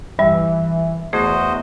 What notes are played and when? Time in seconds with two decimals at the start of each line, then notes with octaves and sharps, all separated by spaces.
0.19 G2 E3 G3 E5
1.13 E2 A3 F#4 G#4 C5 D#5